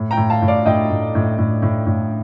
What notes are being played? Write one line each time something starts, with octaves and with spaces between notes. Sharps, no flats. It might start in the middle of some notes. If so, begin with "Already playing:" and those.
Already playing: A2
G5 A#5
A2
F5 A5
A2
D5 F5
A2 D#5 G5
A2
A2
A2
A2
A2